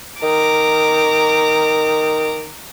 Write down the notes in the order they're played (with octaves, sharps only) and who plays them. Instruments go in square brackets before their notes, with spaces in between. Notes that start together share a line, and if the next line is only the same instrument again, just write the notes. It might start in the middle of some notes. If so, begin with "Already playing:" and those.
[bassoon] D#3 [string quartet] A#5 D6